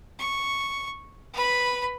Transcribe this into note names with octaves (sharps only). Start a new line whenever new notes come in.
C#6
B4 B5